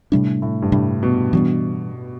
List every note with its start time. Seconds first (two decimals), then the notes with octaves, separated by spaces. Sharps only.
0.12 A2 C3 G3 D4
0.42 A2
0.62 G2
0.72 A2 C3 G3 D4
1.03 B2
1.33 B2 E3 G3 D4